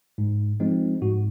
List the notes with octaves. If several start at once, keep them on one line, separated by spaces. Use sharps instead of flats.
G#2
F3 G#3 C4 D#4
G#2 F#4